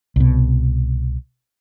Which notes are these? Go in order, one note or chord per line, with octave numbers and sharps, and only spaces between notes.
C2 B2